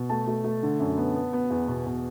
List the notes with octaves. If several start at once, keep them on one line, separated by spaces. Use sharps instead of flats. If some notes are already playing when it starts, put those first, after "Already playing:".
Already playing: B2
A3 A5
A3
A3
D3
F#2
B3
B3
B3
E2
B2
B2